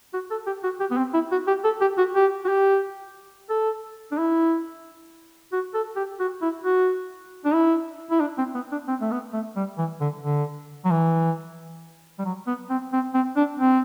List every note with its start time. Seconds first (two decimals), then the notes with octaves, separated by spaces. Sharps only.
0.14 F#4
0.31 A4
0.47 G4
0.63 F#4
0.80 G4
0.91 B3
0.98 C4
1.14 E4
1.32 F#4
1.47 G4
1.64 A4
1.81 G4
1.98 F#4
2.16 G4
2.45 F#4
2.48 G4
3.50 A4
4.12 D4
4.18 E4
5.52 F#4
5.74 A4
5.96 G4
6.20 F#4
6.42 E4
6.64 F#4
7.45 D4
7.54 E4
8.11 E4
8.20 D4
8.38 C4
8.55 B3
8.72 D4
8.88 C4
9.01 A3
9.11 B3
9.33 A3
9.56 G3
9.78 E3
10.01 D3
10.24 D3
10.85 F#3
10.91 E3
12.19 G3
12.25 F#3
12.47 B3
12.70 C4
12.93 C4
13.14 C4
13.36 D4
13.60 C4